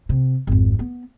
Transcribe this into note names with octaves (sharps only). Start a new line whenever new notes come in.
C3
G#1 F2
B3